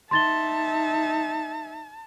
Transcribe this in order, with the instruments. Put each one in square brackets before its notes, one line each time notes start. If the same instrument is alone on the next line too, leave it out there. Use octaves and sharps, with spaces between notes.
[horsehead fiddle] D#4 E5 [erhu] A5 [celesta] C6 A6 G7